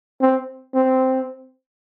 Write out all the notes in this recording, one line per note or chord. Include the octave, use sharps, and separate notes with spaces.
C4
C4